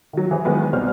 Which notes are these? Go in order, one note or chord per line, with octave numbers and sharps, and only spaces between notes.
D#3 F#3
E3 G#4 C5
D#3 F#3 G#3 B3
C2 B2 C5 F6